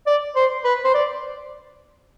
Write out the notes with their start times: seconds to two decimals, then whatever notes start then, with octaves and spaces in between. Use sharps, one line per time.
0.06 D5
0.36 C5
0.64 B4
0.84 C5
0.94 D5